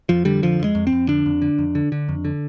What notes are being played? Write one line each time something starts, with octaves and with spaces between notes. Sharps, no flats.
F2 F3
D3 G3
F2 F3
F2 G#3
F2
C4
F2
D3 D4
F2
D3
F2
D3
D3
F2
D3